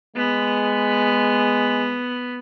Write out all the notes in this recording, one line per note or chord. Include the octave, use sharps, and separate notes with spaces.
G#3 B3